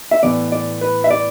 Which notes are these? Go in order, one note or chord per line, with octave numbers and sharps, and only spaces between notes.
E5
A2 E3 B3 D5
D5
B4
E5
D5